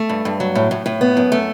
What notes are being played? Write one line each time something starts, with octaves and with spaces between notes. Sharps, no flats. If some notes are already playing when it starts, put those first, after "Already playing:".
Already playing: A3
G2
G2
F#3
A2
A2
A2
B3
F#2
A3